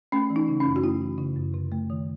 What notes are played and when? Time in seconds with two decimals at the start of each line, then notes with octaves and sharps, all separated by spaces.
0.12 A3 C#4
0.30 E3
0.36 D#4
0.48 C#3
0.60 C#4
0.66 F#2
0.76 F#4
0.83 A3 E4
1.01 E3
1.18 C#3
1.36 F#2
1.54 C3
1.72 A3
1.90 D#3